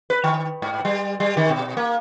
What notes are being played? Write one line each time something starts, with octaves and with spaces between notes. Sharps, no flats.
B4
D#3
G#2
G3
G3
D#3
B2
A#3